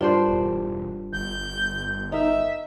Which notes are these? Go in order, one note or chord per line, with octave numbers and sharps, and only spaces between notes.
G2 D4 F4 A#4 C5
E1
G1 G6
D#4 A#4 E5